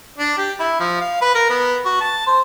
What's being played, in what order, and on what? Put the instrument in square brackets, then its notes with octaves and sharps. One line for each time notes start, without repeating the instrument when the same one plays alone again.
[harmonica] D4
G4
E4
F3
F5
B4
A#4
B3
F#4
A5
C5